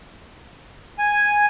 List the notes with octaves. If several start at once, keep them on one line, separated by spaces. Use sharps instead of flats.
G#5